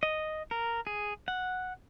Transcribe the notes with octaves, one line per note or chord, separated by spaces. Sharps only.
D#5
A#4
G#4
F#5